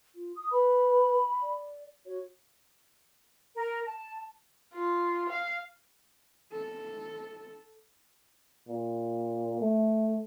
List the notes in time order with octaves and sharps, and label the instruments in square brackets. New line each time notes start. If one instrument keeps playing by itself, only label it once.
[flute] F4
D#6
[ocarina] B4 [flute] B5
[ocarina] D5
[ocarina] F#4 [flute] C#5
[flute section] A#4
A5
[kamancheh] F4
F5
[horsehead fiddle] A4
[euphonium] A#2
A3